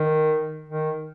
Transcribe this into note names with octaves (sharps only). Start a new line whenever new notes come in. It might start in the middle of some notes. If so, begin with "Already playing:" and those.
Already playing: D#3
D#3